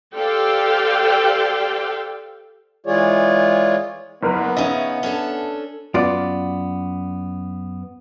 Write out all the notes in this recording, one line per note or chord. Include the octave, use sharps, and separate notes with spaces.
G4 A4 C5 D5 F5 G5
E3 G#3 F4 G#4 C#5 D5
F#1 B3 A#4 B4
C#3 C#4 D#4 E5
C#4 D4 A4
F#2 B3 F4 D5